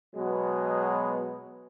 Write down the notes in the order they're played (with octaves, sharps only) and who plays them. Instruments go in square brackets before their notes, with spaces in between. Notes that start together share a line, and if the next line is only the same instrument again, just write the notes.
[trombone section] B2 F#3 G#3 B3